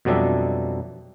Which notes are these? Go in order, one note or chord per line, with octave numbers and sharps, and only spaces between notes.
F2 B2 F#3 G3 D4 E5